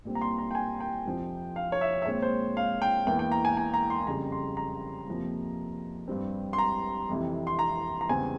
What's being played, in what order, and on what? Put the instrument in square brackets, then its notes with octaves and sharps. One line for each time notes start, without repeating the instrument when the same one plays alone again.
[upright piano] A#2 G3 C4
A#5
C6
A#5
G5
G#5
G5
F2 C3 F3 C4
F5
C#5
E5
E5
A#2 G#3 C4 C#5
C5
F5
G5
E2 E3 A#3 G5
G5
A#5
G#5
G#5
A#5
C6
F2 C#3 G3 A#5
C6
A#5
F2 C3 F3 A#3
G2 G3 C4
C6
A#5
F2 C3 E3
C6
A#5
A#5
E2 C#3 G3 C4 G#5